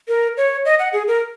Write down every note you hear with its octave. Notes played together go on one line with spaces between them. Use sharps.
A#4
C#5
D#5
F#5
G#4
A#4